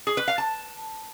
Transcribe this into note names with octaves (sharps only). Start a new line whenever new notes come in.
G#4
B4
F5
A5